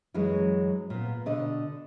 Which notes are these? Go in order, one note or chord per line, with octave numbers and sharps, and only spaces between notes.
F#2 E3 F#3 G#3
A#2 B3
B2 D3 D#5